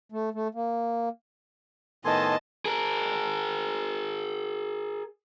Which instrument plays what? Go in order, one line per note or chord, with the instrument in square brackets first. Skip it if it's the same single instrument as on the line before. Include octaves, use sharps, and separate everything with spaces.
[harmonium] A3
A3
A#3
[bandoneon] A2 D#3 B3 [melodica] A4 G#5 C6 [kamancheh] D#5 A5
[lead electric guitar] G#4 A#4